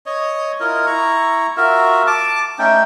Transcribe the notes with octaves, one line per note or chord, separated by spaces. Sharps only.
C#5 D#5
E4 F4 A#4 D#5
E4 A#5 C#6
F4 F#4 A#4 E5
A5 D6
A3 C#4 D#4 G5